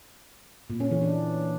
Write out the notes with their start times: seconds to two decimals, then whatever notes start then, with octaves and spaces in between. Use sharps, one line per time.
0.70 A#2
0.80 C#4
0.91 E3
1.02 D4